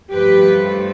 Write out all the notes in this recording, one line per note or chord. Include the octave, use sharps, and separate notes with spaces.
G2 F3 A3 G4 B4